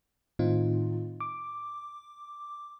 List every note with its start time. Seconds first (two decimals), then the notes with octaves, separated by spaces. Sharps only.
0.39 A2 D#3 C4 D#4 F4
1.20 D6